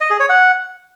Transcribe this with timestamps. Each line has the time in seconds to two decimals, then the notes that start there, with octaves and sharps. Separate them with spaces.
0.01 D#5
0.10 G#4
0.20 C#5
0.29 F#5